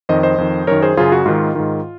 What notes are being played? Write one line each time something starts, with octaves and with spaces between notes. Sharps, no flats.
F2 D#3 C5 D#5
C5 D#5
F2 D#3
F#2 D#3 A#4 C#5
G#4 C5
F#2 C#3 F4 G#4
F#4
G#2 D#3 F4
G#2 D#3